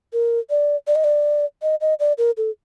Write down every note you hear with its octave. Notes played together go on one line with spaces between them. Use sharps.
A#4
D5
D5
D#5
D5
D#5
D#5
D5
A#4
A4